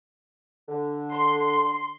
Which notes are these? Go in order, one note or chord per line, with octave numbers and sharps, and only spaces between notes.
D3
C6